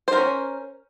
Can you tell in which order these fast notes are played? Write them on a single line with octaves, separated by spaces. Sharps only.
C5 A#4 C#4